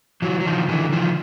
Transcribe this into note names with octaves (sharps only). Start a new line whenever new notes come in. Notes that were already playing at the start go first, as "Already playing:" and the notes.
E3 F#3
F#3
D#3 F3
D3 E3
D#3 F3